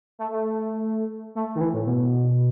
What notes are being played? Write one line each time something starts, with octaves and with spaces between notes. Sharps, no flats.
A3
A3
A3
D#3
E3
A2
B2